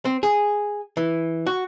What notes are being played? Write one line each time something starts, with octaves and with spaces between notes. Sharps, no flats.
C4
G#4
E3
F#4